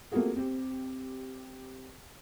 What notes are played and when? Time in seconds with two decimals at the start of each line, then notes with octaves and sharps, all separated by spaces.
0.12 A3 A#3 C4 F4 F#4 G#4
0.36 C4 G4